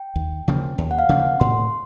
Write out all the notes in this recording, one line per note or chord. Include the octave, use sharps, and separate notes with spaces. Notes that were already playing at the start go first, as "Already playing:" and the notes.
Already playing: G5
D#2
C#3 F3 A#3
D#2
F#5
F5
C#3 F3 A#3
F#5
A2 C6